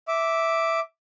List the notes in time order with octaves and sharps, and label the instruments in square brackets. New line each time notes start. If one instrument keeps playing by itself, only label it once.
[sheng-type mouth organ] E5 D6